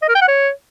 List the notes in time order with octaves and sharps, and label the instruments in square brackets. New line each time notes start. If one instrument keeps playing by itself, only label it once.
[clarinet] D#5
A#4
G5
F#5
C#5